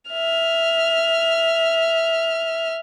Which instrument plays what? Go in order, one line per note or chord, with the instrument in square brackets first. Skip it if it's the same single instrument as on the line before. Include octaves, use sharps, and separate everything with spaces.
[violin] E5 F6